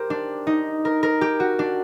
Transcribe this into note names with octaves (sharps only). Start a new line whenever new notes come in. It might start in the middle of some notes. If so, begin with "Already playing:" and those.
Already playing: G4 A#4 C5
D4
D#4
A#4
A#4
G4
F#4
D4